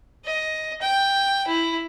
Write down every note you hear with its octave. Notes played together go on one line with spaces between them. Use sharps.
D#5
G5
E4